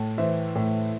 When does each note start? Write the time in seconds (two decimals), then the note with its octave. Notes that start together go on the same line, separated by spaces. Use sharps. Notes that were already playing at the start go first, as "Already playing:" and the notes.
Already playing: A2
0.18 E3 C5 E5
0.55 A2